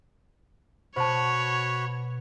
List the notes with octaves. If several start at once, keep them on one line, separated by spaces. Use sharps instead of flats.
B2 F#4 C5 C#5 A5 B5